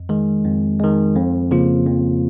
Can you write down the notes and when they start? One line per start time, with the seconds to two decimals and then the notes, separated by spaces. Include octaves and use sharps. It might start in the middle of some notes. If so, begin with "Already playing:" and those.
Already playing: F2
0.09 D#3 G#3
0.45 F2
0.79 D#3 G#3
1.15 F2
1.51 C#3 F3 A#3 F4
1.86 F2